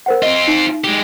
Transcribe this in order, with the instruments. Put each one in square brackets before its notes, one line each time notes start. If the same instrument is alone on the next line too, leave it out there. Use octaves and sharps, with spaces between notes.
[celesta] A#4 C5 F#5
[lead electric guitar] C4 F4 [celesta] D#5
[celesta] D#4
[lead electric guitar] G#3 G4